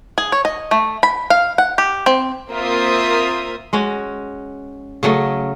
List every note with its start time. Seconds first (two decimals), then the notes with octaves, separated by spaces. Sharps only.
0.18 G#4
0.32 C#5
0.45 D#5
0.71 A3
1.03 B5
1.30 F5
1.58 F#5
1.78 G4
2.06 C4
2.50 A#3 C4 F4 C5 E5 D#6
3.73 G#3 C#4 F#4
5.03 C#3 F#3 A3 D#5